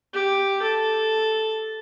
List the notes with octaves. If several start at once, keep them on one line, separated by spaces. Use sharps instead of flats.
G4
A4